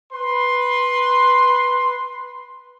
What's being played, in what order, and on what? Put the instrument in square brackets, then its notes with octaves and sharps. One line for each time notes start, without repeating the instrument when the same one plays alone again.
[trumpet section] B4 C6